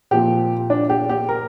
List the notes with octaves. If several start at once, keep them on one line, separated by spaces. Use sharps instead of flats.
A#2 F3 C4 G4
D4
G4
G4
A#4